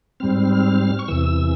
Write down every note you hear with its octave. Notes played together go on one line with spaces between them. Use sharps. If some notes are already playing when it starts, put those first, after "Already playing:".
G#2 G3 C4 F6
C#6
E2 C3 E3 E6